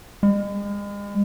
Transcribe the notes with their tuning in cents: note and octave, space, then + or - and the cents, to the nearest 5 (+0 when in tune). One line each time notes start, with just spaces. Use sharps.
G#3 -40